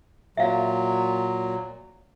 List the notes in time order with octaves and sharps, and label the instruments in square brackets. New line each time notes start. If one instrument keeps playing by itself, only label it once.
[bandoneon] A#2 F#3 [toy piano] E5 F5